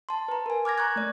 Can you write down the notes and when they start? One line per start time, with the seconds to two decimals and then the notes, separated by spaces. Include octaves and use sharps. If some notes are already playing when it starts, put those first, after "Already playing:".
0.09 A5 C6
0.28 B4 A#5
0.46 A#4 G#5
0.65 D6 F6 G#6 A#6
0.78 A#5 C#6 F#6 G#6
0.96 A3 D5